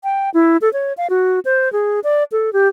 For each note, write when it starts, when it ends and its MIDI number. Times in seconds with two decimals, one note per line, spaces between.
0.04 0.30 79
0.34 0.57 64
0.61 0.71 69
0.73 0.93 73
0.97 1.07 77
1.10 1.40 66
1.45 1.71 72
1.73 2.00 68
2.04 2.24 74
2.32 2.53 69
2.53 2.68 67